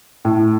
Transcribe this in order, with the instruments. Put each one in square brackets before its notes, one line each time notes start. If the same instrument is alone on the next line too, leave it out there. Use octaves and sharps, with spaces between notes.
[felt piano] A2